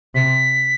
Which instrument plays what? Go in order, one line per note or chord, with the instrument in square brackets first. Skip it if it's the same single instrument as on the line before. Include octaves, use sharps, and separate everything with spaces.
[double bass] C3 [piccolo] B6